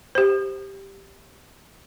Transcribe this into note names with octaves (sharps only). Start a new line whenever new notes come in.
G4 C5